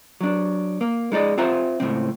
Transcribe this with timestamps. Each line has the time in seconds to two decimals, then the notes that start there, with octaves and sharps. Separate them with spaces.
0.21 F#3 D4
0.81 A#3
1.12 G#3 D#4 G#4 D5 D#5
1.38 C4 F4 C5 E5 F#5 A#5
1.80 C#2 A2 C3 C4